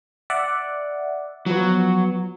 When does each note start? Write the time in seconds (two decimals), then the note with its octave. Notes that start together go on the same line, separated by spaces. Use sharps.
0.30 D5 E5 F#5
1.46 F3 F#3 B3